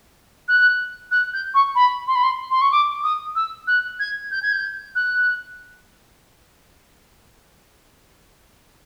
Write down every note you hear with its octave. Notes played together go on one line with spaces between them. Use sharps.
F#6
F#6
G6
C#6
B5
C6
B5
C6
C6
C#6
D6
D#6
E6
F#6
G#6
G6
G#6
G6
F#6